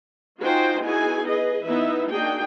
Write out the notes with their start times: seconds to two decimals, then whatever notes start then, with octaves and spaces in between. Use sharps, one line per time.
0.41 D#4 F4 F#4 C5 G5 G#5
0.83 B3 D#4 E4 F#4 G#4 G#5
1.29 G#4 B4 D#5
1.66 E3 B3 D#4 E4 E5
2.10 A#3 D4 D#4 F#4 G#4 G5